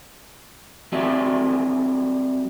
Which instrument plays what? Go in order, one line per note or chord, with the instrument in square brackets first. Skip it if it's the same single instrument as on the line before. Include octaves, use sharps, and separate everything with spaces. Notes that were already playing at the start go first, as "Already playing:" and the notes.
[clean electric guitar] F#3 G3 C4 F#4 D5 E5